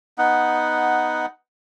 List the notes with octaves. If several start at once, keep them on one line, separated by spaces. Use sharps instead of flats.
B3 D#4 F#5